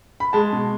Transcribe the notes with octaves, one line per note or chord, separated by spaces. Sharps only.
B5
G#3 A5
B2